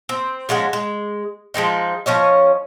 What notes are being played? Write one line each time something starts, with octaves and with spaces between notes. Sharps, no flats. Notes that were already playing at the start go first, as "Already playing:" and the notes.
C4
F3 G#3 C#4 F#4
G#3
F3 G#3 C4 D#4
F3 C#4 C#5 D#5